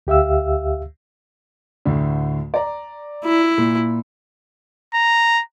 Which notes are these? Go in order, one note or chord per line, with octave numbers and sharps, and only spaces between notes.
D2 G4 E5 F5 E6
D2 A2 D3
D5 A#5
E4
A#2
A#5